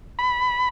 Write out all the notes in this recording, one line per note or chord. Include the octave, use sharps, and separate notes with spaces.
B5